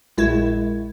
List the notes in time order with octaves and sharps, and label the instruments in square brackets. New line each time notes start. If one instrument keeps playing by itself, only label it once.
[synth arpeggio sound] A#1 G#3 E4 G#6